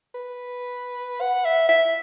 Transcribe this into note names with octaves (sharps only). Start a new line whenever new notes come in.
B4
F#5
E5
E5